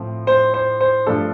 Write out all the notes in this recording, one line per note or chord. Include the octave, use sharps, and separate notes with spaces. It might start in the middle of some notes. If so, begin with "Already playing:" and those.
Already playing: A2 F3 C4
C5
C5
C5
G2 F3 A3 D4 A4